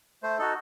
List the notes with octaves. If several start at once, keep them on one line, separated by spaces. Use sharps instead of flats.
A3 C5
D#4 F#4 A4